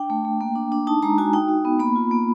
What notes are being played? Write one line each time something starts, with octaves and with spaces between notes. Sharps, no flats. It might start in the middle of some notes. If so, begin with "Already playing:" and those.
Already playing: D4 G5
A3
A3
A#3
D4
D4
D#4 A5
G#3 A#5
F#4 G#5
D#4 G5
F#4
B3
A#3 B5
F4
A#3